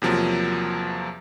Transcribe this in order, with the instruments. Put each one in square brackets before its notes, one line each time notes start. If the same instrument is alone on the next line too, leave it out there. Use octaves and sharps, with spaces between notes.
[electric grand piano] E2 C3 F3 F#3 A#3